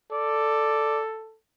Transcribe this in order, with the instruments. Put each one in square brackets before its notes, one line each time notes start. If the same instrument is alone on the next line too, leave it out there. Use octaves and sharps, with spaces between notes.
[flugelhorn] A4 [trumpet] D5